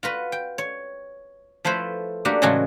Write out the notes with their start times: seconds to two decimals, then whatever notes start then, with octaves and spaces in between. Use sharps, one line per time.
0.03 F4 F#4 B4
0.32 G5
0.58 C#5
1.65 F3 A3 E4 B4 C5
2.25 A3 A#3 D4 F#4 G4
2.42 A2 C#3 E3 G#3 F#4 A4